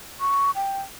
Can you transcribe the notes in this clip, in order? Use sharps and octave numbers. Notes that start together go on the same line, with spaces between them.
C#6
G5